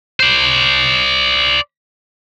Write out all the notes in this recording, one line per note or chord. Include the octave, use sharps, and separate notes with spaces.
C5 D5